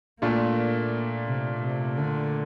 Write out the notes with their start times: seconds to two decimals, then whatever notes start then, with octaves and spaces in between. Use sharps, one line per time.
0.22 A#2 A3 A#3 D4 F4
1.27 C3
1.62 C3
1.98 D3